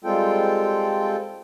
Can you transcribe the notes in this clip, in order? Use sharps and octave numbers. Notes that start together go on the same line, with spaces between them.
G3 G#3 C4 F4 A4 G5